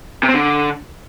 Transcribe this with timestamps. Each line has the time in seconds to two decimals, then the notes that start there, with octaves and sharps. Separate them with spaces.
0.23 C3
0.29 C4
0.34 D3